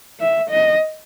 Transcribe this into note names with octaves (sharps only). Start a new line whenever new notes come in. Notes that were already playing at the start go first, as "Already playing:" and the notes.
E5
D#5